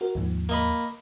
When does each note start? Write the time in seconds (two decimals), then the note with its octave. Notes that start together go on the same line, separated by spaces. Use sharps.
0.01 F#4 A#4
0.15 D#2 G#2 F3
0.49 A#3 D#5 B5